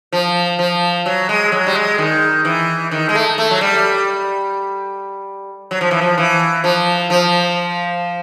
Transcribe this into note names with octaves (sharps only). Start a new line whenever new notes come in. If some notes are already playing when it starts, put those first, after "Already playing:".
F3
F3
F#3
G#3
F#3
G3
G#3
D#3
E3
D#3
G#3
A3
A3
F#3
G3
F#3
F3
E3
F3
E3
F3
F3